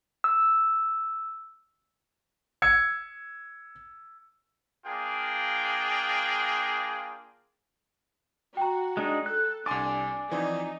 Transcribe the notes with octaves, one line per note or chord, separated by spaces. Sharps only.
E6
E6 G#6 C#7
A#3 D4 F4 G#4 G5
F#4 G5 A#5
G#3 D4 D#4
A4 F#6
C2 D4 G#5 C6 D6 A6
E3 F3 C4 D#4 D5